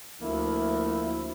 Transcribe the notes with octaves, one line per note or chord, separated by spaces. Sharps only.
D2 D3 F3 A#3 E4